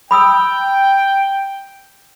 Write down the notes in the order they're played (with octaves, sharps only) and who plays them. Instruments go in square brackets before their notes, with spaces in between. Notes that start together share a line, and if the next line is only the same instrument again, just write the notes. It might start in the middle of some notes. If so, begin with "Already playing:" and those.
[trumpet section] G5 [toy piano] B5 D#6 E6